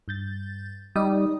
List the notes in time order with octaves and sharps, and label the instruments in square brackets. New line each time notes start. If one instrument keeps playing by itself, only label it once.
[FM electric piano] G2 G6 A6
[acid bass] G3 [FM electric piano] D#4 D#5 D#6